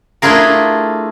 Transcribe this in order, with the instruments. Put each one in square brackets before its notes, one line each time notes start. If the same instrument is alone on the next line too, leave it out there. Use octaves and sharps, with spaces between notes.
[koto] A3 D4 E4 F4 G#4 A#4